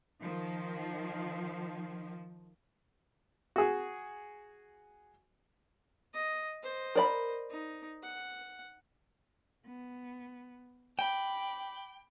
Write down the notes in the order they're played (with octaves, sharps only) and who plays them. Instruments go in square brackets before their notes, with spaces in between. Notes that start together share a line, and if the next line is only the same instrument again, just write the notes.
[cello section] D#3 F3
[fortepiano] F#4 G#4
[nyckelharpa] D#5
C5 D#5
[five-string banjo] A#4 D5 B5
[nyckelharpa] D#4
F#5
[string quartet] B3
[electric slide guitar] G5 [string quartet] B5 D6